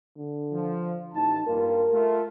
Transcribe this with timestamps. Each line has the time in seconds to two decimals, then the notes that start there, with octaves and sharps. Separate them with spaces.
0.17 D3
0.52 F3
1.14 A1 D#4 A5
1.47 G2 A#3 F4 A#4
1.92 A3 F4